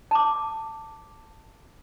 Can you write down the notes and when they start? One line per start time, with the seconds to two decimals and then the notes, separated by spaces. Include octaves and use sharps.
0.11 A5 D6